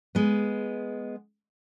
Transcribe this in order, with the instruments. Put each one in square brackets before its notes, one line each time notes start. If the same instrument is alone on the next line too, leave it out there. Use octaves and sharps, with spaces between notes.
[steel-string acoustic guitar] G#3 B3